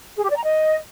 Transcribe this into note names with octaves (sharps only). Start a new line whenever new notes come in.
G#4
G4
D5
A#5
D#5